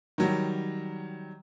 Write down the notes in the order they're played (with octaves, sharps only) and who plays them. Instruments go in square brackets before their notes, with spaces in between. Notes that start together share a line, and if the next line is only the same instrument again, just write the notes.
[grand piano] D#3 F#3 G3